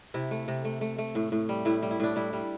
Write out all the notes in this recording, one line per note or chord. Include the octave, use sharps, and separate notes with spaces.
C3 E4
A3
C3
A3
A3
A3
A2
A2
G3
A2 E4
G3
E4
A2 D4
G3 E4
G3